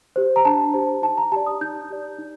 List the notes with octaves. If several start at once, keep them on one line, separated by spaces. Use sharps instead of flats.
G4 C5
A#5
D4 A5
G4 C5
D#4 A5
A#5
G4 D5 A5
D#6
D#4 G6
G4 D5
D#4